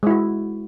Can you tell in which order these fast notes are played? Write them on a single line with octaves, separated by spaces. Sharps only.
G#3 E4 F#4